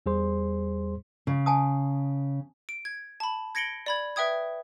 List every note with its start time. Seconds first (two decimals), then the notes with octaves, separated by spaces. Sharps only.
0.06 E2 G3 G#4 C5 C6
1.27 C#3
1.46 G#5 A5 D#6
2.69 D7
2.85 G#6
3.20 A5 B5
3.55 G#6 A#6 C#7 D7 F#7 G7
3.86 D5 B5 G#6
4.16 B4 E5 G5 D#6 G#6